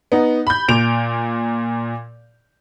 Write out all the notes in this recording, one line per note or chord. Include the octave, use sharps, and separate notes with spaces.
B3 D#4
B5 G6
A#2 D7 F7